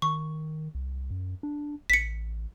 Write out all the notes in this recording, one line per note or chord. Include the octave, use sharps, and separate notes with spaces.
D#3 C#6
C2
F#2
D4
A1 B6 C#7